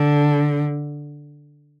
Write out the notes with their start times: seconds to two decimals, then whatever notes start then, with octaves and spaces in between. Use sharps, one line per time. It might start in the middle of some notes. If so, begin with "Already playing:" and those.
Already playing: D3